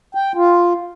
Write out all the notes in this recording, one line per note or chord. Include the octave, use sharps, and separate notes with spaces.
G5
F4